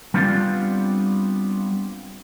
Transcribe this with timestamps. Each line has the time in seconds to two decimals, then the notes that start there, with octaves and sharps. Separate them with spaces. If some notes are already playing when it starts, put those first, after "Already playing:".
0.14 G3 B3 C4 D4 F4 G4